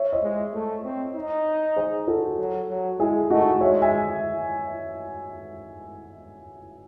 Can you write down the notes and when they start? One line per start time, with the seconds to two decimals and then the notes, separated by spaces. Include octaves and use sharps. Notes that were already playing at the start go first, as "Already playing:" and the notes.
Already playing: C#5 E5
0.13 C5 D#5
0.22 G#3
0.54 A3
0.84 C4
1.16 D#4
1.76 G#4 C5
2.07 F#4 A4
2.38 F#3
2.69 F#3
2.99 G#3 E4 G#4
3.30 A3 D#4 F#4
3.61 G#3 C#5 E5
3.82 E5 G#5